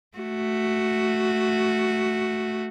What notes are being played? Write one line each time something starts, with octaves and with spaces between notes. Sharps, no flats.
A3 F#4